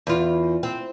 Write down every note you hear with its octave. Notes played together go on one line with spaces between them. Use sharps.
E2 F4
C4